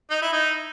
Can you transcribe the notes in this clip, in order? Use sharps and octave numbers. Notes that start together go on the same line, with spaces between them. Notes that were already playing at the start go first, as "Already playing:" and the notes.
D#4
E4
D#4